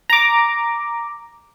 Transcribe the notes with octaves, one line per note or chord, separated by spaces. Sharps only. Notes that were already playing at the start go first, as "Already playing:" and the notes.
A#5 D6